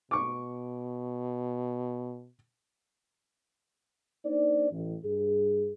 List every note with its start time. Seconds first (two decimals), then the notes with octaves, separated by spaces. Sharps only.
0.11 B2 C#6 D6
4.25 A#3 D4 D#4 C5 D5
4.71 A1
5.04 G2 G#4